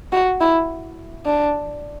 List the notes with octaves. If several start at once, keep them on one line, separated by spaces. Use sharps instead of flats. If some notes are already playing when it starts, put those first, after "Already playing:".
F#4
E4
D4